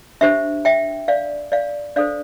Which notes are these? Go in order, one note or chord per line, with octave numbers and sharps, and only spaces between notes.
D4 G4 C5 E5
E5 G5
D5 F5
D5 F5
D4 A4 C5 D5 F5